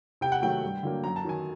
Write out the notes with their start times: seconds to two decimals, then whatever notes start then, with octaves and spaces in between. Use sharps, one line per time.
0.21 C3 G5
0.32 F#5
0.42 D#3 F#3 A3 G5
0.63 G2
0.83 D3 F#3 A#3
1.04 F#2 A#5
1.16 A5
1.24 D#3 F#3 G#5